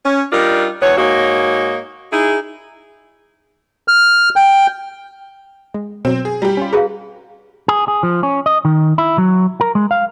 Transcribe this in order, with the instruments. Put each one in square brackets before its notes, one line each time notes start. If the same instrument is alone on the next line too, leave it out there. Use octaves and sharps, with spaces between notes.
[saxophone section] C#4
G3 D4 D#4 F4 A#4
E2 B3 C#5
G#2 A#3 D#4 F#4 C#5
D#4 E4 G#4
[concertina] F6
G5
[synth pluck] G#3
[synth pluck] B2 F#3 [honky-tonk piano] C4
[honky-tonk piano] G#4
[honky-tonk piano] G3 G4 [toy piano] E4 [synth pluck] A#5
[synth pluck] C#4 F4
[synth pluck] F#4 B4 A#5 [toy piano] G#4 F5
[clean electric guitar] G#4
G#4
F3
C#4
D#5
D#3
E4
F#3
A#4
G#3
F5